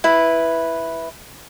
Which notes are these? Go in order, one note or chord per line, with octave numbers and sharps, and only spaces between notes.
E4 B4